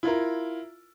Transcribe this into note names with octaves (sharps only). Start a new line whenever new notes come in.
E4 F4 A#4